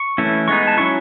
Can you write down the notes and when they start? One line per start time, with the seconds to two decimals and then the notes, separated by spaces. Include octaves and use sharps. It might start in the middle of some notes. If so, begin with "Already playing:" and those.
Already playing: C#6
0.18 E3 A3 C#4 E4
0.48 G#3 B3 D#4 C#6
0.67 A5
0.77 F#3 C#4 E4 C#6